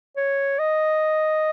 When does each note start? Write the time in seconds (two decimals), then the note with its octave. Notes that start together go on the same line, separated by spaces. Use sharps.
0.17 C#5
0.59 D#5